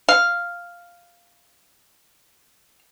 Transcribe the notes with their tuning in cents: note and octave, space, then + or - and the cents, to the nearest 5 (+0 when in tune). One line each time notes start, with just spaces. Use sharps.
F5 +0